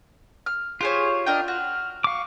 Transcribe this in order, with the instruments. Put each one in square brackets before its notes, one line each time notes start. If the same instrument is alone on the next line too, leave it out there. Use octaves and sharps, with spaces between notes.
[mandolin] F6
[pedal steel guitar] F4 [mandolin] G4 C5 C#5 [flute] G#4
[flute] D4 [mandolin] A#4 D#5 G5
[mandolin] F#4 [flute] F6
[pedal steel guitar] F5 D6 [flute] C#6